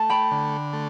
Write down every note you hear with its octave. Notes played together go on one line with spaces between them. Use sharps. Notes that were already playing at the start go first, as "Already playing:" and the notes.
Already playing: A3 A5
G5 B5
D3
A3